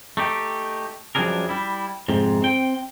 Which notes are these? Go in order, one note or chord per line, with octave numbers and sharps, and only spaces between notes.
A3 D#4 G4
F#2 F3 G3 D4 G#4 A#4
G3 E4
F2 G#2 C3
C4 G5